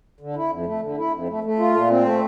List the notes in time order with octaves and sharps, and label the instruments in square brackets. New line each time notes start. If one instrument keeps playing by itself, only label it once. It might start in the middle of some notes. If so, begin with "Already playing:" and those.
[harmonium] D3
E4
F2
A3
D3
E4
F2
A3
A3
F4
A#2
C4
A3